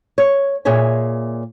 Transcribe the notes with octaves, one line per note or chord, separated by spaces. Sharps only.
C#5
A#2 G#4 C#5 E5